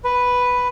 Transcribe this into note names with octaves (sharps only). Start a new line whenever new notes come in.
B4